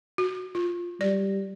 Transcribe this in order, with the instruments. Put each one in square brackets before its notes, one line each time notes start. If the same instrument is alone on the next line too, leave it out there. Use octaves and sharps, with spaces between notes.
[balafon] F#4
F4
[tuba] G3 [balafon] D5